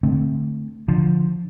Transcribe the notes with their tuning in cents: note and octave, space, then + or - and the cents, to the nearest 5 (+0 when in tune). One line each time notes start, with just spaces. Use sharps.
D3 +0 A3 +0 C4 +0
D3 +0 F3 +0